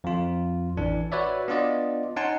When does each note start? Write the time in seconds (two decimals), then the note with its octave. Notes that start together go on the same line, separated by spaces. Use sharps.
0.04 F2 F4
0.77 A1 E3 D4
1.12 F#4 B4 C#5 D5 E5
1.48 B3 D4 F4 D5 D#5
2.16 C#4 D#4 F#5 G#5 A5 C6